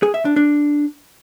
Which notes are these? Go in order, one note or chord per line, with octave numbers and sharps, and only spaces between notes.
G#4
E5
D4
D4